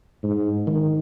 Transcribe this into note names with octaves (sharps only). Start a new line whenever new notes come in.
G#2
D#3